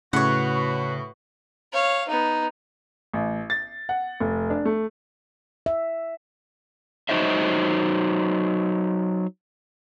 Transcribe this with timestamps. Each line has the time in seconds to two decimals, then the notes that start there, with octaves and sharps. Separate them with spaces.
0.13 A2 C#3 F#4 B4 C#5 F#5
1.73 C#5 F5
2.09 B3 D#4
3.14 A1
3.50 A6
3.89 F#5
4.20 F1
4.50 D4
4.65 A3
5.66 E5
7.09 F#3 D#4 C5 D#5 E5